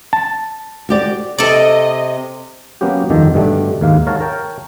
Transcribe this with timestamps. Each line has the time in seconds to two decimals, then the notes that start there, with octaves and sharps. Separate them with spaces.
0.13 A5
0.89 F#4 G4 D5
1.38 C3 A4 D5 D#5
2.81 F#3 A#3 B3 C#4 F#4 G4
3.10 G1 F2 D#3 G4 A4
3.34 G2 B2 D3 G3 A3 D4
3.81 D#2 G#2 A#3 F5
4.07 A#4 C#5 F5 F#5 A5
4.20 A#4 C#5 G5 A5